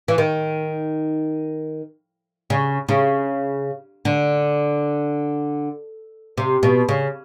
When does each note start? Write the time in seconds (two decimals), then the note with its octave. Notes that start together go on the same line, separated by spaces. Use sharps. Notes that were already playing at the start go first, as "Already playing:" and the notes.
0.08 E3
0.18 D#3
2.50 C#3
2.89 C#3
4.05 D3
6.37 C3
6.63 B2
6.89 C#3